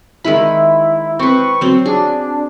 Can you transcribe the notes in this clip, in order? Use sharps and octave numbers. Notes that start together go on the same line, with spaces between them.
D#3 G#3 E4 B5
C4 B4 C#6
F#3 C4
D4 G#4